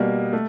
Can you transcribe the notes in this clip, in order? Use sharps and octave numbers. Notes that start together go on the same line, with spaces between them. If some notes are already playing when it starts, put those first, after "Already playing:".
Already playing: B2 G3 A#3
A3